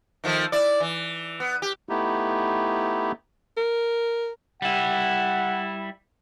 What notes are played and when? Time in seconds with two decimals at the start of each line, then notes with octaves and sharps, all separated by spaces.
0.24 D#3 F3 A3
0.52 E4 D5
0.80 E3
1.40 B3
1.62 G4
1.89 A3 B3 D#4 E4 G4
3.57 A#4
4.62 G3 E4 F#5